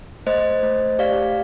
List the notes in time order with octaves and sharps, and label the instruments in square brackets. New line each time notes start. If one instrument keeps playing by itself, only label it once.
[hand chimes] A3 C5 D#5
A3
G4 D5 F5